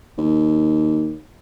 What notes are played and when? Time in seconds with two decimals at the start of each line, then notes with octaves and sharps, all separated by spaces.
0.18 D#2